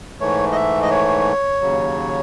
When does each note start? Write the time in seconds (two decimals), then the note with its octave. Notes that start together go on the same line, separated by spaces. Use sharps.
0.20 G#2 E3 A3 C#5
0.52 D#5
0.55 E5
0.82 D#5
0.91 C#5
1.61 D#2 C#3 F#3